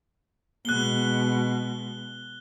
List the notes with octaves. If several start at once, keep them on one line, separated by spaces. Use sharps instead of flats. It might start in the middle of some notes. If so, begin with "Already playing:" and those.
B2 G#3 F#6 G7